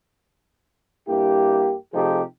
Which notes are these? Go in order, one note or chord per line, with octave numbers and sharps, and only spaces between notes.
G2 A#3 E4 G4
C3 F3 A3 D#4 G4 G#4